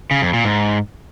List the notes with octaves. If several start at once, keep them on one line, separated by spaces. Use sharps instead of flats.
C#3
F2
A#2
G#2